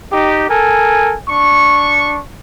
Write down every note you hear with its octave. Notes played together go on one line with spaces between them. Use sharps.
D#4 G4
A4 A#4 G#5
D4 C#6